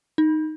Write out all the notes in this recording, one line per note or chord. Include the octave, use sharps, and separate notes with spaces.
D#4